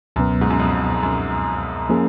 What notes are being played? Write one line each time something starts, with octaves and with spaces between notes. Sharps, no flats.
C#2 F#2 B2 F#3 B3
G#2
F#2
F2
F#2
F3 A#3 C#4 G#4